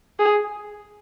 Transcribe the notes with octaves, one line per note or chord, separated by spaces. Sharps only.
G#4